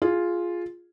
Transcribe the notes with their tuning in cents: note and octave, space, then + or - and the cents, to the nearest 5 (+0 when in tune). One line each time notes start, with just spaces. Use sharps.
F4 +0 G#4 +0